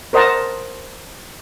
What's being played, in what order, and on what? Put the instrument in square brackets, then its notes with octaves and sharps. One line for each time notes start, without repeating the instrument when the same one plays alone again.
[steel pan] A#4 C5 D#5 F#5 A5 A#5